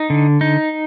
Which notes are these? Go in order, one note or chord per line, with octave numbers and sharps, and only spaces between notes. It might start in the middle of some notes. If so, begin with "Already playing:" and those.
Already playing: D#4
D3
D#4